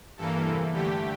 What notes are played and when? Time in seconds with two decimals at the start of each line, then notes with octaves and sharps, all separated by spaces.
0.17 G2 E3 A#3 A4
0.45 E2 C3 E3
0.73 G2 D3 A3 G4